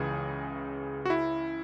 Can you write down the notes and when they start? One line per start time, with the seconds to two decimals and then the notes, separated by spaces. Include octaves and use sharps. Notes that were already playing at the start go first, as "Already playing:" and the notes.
Already playing: C#2 C#3 E3 G#4
1.05 F#4
1.10 E4